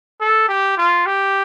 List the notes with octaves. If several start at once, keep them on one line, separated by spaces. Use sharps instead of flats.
A4
G4
F4
G4